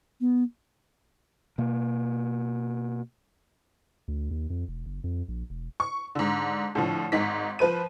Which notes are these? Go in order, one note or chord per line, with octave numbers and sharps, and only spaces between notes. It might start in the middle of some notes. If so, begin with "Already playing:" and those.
B3
B2 A#3
D2
D#2
F2
E1
F#1
F2
A#1
E1
C#6
G#2 D3
A2 D3 F3
G#1 G#2 D#4 B6
F3 B4 C5 D#7